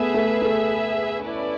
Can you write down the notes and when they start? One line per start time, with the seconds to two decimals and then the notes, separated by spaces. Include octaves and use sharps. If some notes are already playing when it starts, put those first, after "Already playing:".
Already playing: A3 B3 G#4 B4 E5
0.14 A3
0.42 A3
1.24 C#4 E4 B4 D5